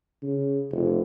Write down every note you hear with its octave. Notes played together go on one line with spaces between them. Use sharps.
C#3
F1